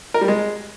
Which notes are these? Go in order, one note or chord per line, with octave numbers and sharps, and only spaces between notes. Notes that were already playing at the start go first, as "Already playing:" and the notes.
A#4
G3
G#3